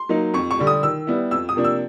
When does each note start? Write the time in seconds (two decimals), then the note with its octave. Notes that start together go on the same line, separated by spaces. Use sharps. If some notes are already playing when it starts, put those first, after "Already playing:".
Already playing: C6
0.09 F#3 A#3 D#4
0.34 F2 C#6
0.51 C#6
0.59 D3 G3
0.67 D#6
0.83 D#3 E6
1.07 G3 B3 E4
1.31 F2 E6
1.49 D#6
1.56 C3 F3 A#3 D4
1.64 E6